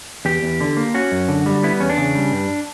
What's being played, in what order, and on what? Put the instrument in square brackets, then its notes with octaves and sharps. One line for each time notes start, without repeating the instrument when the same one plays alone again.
[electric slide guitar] E2 G4
E2
D3
A#3
C#4 F#4
F#2
D3
G3
B3 E4
E2 C#4
D4
C#3
G3
G2